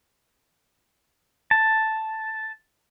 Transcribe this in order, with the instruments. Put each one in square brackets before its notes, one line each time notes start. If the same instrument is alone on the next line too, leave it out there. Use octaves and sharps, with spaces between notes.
[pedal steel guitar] A5